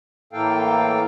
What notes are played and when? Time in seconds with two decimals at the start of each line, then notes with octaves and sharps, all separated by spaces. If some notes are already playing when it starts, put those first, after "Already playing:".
0.33 A2 E3 A#3 A4 F5 G5